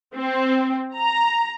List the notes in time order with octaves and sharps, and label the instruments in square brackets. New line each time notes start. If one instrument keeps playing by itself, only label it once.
[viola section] C4
A#5